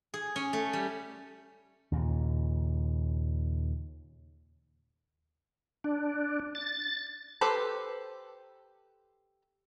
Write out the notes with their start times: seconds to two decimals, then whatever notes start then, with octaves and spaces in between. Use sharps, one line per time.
0.14 G#4
0.36 C#4
0.53 A3
0.73 G3
1.92 D#2 A#2 C#3
5.84 D4
6.55 A6
7.41 G4 A4 B4 C5